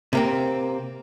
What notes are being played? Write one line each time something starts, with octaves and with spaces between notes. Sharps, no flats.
C3 A#3 C4